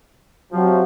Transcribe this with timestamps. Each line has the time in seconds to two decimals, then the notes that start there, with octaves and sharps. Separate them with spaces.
0.52 C3 F3 F#3